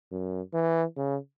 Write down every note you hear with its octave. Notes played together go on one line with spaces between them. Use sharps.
F#2
E3
C#3